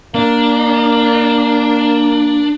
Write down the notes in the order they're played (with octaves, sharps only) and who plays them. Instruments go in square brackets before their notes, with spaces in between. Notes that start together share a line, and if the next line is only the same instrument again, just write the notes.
[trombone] A#3 [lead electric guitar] D4